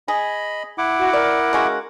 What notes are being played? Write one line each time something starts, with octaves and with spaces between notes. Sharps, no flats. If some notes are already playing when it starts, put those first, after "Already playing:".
G#4 D#5 B5
E4 F#5 D6
F#4
A#4 D5
C#3 G#3 F#4